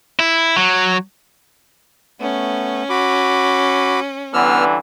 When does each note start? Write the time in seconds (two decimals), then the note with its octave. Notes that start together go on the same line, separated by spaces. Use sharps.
0.19 E4
0.56 F#3
2.20 A3 B3 C#4
2.90 F#4 B5 D6
4.34 G2 D3 E3 B3 E6 F6